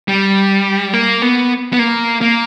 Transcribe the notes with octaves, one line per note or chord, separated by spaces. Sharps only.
G3
A#3
B3
B3
A#3
A#3